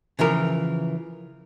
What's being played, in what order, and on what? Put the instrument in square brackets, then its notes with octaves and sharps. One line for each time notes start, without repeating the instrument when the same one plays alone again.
[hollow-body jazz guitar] C#3 E3 F3 A#4